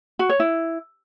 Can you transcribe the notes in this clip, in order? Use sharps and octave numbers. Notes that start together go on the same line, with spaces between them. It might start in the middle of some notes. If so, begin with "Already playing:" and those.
F#4
C#5
E4